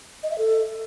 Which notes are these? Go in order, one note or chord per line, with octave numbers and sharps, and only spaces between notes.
D#5
E5
A4